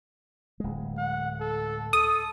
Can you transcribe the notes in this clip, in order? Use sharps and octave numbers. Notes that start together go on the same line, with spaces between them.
D1 G#3
F#5
A4
A4 D#6